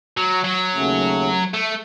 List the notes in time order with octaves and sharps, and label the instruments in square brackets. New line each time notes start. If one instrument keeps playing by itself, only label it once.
[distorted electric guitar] F#3
F#3
[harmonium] D#2 C#3 A3 C#4
[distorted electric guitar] A3